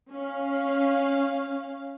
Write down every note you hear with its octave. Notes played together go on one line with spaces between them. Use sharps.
C#4 F5